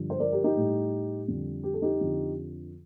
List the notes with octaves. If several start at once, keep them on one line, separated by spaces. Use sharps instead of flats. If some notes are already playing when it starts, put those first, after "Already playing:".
Already playing: G2 D3 F3
C5
A#4 D5
G4 A#4
D#4 G4
A2 G3
F2 D3 G3
G4
A4
D#4 G4
F2 D3 F3